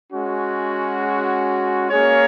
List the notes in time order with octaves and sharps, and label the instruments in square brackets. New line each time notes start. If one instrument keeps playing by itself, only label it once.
[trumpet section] G#3 C#4 F#4
A#3 C#4 G#4 C#5